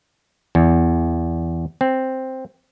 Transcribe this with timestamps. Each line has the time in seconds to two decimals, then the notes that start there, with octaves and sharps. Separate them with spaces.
0.55 E2
1.81 C4